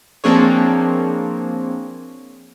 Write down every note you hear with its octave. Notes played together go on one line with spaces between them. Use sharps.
F3 A#3 C4 D4 G#4 C#5